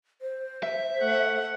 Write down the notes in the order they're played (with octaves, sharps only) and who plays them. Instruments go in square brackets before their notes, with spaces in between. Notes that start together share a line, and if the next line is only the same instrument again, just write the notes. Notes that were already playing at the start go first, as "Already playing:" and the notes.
[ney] C5
[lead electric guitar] E5
[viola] A3 F#5